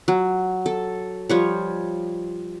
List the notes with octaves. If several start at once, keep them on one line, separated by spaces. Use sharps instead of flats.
F#3
A4
F3 G3 C#5